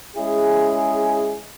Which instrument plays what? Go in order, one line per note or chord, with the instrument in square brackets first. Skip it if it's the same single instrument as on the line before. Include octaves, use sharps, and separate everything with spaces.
[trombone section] G#3 C#4 E4 G#4